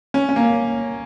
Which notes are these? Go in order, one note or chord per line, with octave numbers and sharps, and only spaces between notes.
C#4
C#4
A#3